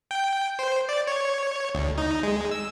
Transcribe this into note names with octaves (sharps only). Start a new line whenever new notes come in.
G5
C5
D5
C#5
D2
D#4
G#3
E6